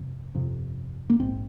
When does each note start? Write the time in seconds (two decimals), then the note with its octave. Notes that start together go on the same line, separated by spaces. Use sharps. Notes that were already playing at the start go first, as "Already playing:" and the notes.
Already playing: G1 F2 C3
0.35 G1 F2 C3
1.10 A#3
1.19 A#1 G#2 C4